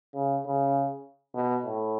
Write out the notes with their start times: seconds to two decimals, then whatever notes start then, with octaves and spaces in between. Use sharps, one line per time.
0.15 C#3
0.45 C#3
1.35 B2
1.65 A2